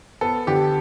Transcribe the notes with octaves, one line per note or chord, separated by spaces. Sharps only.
B3 A4
D3 G4